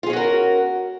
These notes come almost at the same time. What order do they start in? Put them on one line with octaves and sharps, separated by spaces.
F4 G#4 C#4 F#4 A#4